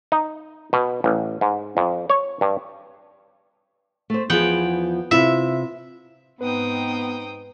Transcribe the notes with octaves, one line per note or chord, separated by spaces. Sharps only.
D#4
B2
A1
G#2
F2
C#5
G2
A3 C5
E2 F3 B3 G#4 F#5 G5
C3 E4 F4 E5
G#2 B3 C4 D#4 B4 G5 D#6